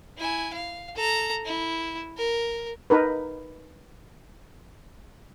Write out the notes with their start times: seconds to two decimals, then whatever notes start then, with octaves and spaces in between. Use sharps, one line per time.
0.18 E4 G#5
0.54 F5
0.96 A4 A#5
1.45 E4
2.17 A#4
2.90 D#4 A#4 B4